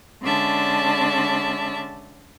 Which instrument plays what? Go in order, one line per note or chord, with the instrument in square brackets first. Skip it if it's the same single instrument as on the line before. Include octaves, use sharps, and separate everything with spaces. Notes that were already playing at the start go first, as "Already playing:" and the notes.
[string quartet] D3 G#3 C#4 D5 E5 A5